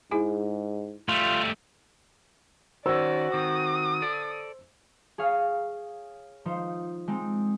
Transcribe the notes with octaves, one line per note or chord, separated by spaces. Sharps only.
G#2 E4 G#4 G#5
G3 A3 F4
D#3 C#4 F#4 C5 D5 E6
D#3 C4 D#6
A4 D5
G#4 C#5 F5
F3 D#4 C5
G#3 C4 D#4